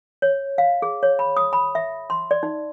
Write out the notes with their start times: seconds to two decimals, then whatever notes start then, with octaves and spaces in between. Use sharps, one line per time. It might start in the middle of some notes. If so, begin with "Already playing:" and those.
0.22 C#5
0.58 F5
0.82 G#4
1.03 C#5
1.19 B5
1.37 D#6
1.53 B5
1.75 E5
2.10 C6
2.31 D5
2.43 D#4